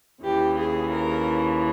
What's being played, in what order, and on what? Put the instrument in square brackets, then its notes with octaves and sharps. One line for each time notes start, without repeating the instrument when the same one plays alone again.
[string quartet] D#2 C#3 E3 G4
G#4
A#4